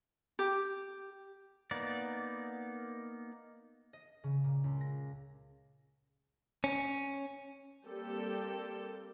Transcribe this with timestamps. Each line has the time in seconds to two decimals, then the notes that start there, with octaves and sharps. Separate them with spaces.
0.39 G4
1.71 A#3 B3 D#4 D5
3.93 D#5
4.24 C#3
4.44 A#2
4.64 C#2
4.81 A#6
6.64 C#4
7.85 G3 A#3 C4 G4 A4 G5